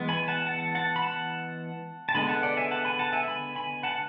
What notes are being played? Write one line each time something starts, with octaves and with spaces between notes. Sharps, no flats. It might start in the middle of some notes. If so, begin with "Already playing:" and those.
Already playing: E3 G#3 B3
G#5 B5
F#5 A5
F#5 A5
F#5 A5
B5
F#5 A5
A5
D3 G#3 B3 G#5 B5
F#5 A5
D5 F#5
E5 G#5
F#5 A5
G#5 B5
F#5 A5
E5 G#5
G#5 B5
G#5 B5
F#5 A5